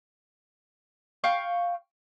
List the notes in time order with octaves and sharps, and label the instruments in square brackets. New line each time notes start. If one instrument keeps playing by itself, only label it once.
[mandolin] F5 G5 C#6